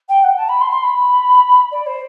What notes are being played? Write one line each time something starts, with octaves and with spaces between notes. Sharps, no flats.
G5
F#5
A5
B5
C6
C6
B5
D5
C5